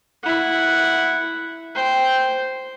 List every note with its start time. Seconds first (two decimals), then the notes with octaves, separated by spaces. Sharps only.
0.23 E4 F#5
1.75 C5 G5